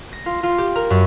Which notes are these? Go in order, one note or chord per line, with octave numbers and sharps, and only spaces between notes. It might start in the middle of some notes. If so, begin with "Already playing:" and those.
A#6
F4
F4
G4
A#4
F#2